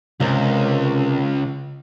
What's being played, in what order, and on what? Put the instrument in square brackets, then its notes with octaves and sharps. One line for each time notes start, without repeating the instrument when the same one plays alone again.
[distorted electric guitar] C#2 [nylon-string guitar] C3 A#4 F5